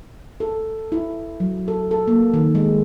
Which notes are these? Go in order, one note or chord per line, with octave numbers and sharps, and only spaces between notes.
A4
E4
F#3
A4
A4
A#3
D#3
G#3